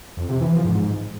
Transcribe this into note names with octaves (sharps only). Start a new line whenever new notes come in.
F2
C3
E3
F3
G#2